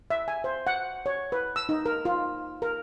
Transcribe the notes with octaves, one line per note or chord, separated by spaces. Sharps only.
E5
G#5
C5
F#5
C#5
B4
E6
D#4
A#4
F4
A#4